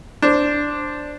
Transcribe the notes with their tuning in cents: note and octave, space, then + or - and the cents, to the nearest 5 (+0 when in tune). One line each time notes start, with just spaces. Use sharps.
D4 +0 C5 +0